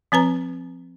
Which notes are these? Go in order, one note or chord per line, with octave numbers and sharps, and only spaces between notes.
F3 C4 B4 A#5